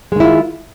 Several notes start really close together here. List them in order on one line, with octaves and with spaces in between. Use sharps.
G#3 D#3 E4 F4